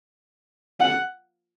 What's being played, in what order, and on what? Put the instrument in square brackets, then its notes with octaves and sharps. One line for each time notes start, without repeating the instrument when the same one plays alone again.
[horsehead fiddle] F#5